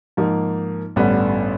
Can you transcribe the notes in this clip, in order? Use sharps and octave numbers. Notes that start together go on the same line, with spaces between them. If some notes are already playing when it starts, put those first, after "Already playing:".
G#2 F3 A#3 D#4
A1 G2 D3 G3 B3